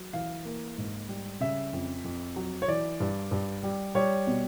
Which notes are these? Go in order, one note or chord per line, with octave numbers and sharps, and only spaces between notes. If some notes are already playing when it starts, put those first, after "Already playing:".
Already playing: F#3
E3 F5
A#3
G#2
G3
C#3 E5
F2
F2
F#3
C#5
E3 D5
G2
G2
G3
G3 C#5
B2